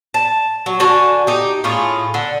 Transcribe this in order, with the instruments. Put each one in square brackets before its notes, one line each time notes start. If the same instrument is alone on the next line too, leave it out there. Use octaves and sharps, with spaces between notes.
[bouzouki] A5
F#3
D3 F#4 G#5 A5
D#4 G4
A2 C#4 F4 G#4
D3